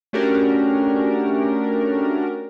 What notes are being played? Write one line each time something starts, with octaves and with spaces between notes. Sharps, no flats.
A3 C#4 D4 F#4 G4 A#4